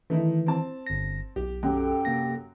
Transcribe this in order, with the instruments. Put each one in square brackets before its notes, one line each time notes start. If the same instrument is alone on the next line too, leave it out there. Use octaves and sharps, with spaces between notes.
[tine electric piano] D#3 E3 [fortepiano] A3 D#4 E4
[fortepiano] C4 A5
[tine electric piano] G1 A#6
[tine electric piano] B1 [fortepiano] G4
[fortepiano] F#2 [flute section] G4 A4 G5
[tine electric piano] C3 A#3 A#6